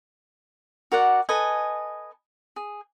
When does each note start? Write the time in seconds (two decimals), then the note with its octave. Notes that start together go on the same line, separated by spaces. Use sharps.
0.92 F#4 A#4 D5 F#5
1.29 A4 B4 D#5 G#5
2.56 G#4